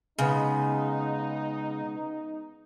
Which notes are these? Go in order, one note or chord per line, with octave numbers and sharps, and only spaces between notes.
C#3 G#3 B3 D#4